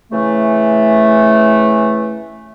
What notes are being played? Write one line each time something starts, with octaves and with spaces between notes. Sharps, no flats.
C#3 E3 A3